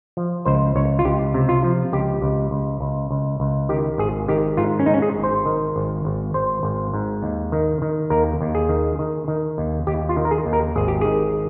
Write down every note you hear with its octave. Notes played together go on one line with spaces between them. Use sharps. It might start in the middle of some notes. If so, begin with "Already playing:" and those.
F3
C#2 C5
C#2 C#5
F4
C#2 G4
C3
F4
F3
C#2 G4
C#2
C#2
C#2
C#2
C#2
D#3 G4
G#1 G#4
D#3 G4
G#2 F4
C#4
G#2 D#4
C#4
G#4
G#1
C5
D#3
G#1
G#1
G#1 C5
G#1
G#2
D#2
D#3
D#3
D#2 A#4
D#2
G#4
D#3
D#3
D#3
D#2
D#2 G4
F4
D#3
A#4
G#4
D#2
A#4
G#1 G#4
G4
D#3 G#4